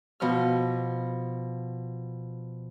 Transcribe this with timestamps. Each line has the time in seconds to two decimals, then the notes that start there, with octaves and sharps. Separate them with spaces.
0.20 B2 F3 F6